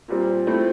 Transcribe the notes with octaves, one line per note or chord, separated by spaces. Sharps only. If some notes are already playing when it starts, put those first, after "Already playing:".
A#2 G3 C4
F3 A3 C4 E4